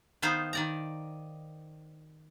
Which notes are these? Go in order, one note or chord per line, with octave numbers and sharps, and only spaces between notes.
D#3 B3 D#4 C5 F5
D#3 D5 A#5